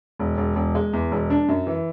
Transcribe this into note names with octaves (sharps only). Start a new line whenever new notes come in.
E1
E1
E1
G#3
E2
E1
D4
F#2
E3